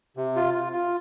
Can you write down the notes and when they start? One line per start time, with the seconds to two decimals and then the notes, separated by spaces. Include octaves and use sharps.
0.17 C3
0.36 F4
0.54 F4
0.73 F4